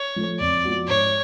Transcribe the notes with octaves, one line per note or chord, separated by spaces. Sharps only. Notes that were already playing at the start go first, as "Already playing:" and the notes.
Already playing: C#5
F3 A3
F2 D5
F3 B3 F#4
G#2 C#5